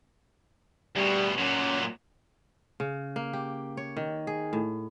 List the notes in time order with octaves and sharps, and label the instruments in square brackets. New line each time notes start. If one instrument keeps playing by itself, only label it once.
[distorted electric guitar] D2 B2 [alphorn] G3
[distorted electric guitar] A#2 F#3 [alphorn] C#4
[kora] C#3
A#3
G4
C#5
D#3
G#4
A2